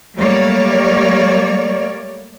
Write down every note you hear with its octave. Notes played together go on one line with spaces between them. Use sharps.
F#3 G3 A3 A#3 C#5 D5